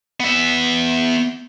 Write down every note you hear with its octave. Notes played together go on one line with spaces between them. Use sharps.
B3 E5